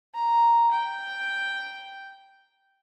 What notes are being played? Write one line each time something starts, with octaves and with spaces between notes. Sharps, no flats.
A#5
G5